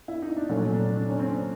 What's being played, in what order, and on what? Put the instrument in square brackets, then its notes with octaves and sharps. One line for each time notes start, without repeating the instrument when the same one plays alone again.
[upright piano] E4
D#4
D4
A#2 F#3 A3 C#4
D3 D4
D3 D4
C#4
C4